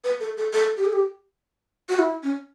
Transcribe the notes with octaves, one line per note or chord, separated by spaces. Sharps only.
B4
A4
A4
A4
G4
A4
G4
F#4
E4
C#4